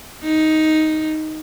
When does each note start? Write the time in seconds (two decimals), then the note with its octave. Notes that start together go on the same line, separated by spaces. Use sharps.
0.24 D#4